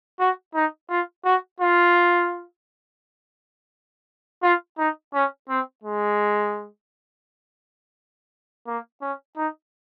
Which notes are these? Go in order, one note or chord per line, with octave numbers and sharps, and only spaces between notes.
F#4
D#4
F4
F#4
F4
F4
D#4
C#4
C4
G#3
A#3
C#4
D#4